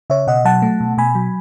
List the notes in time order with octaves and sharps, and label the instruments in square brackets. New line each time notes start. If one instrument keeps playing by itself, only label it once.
[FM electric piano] C#3 C#5 E5
B2 D#5 F#5
F#3 F#5 A5
A3
B2
B2 G#5 B5
F#3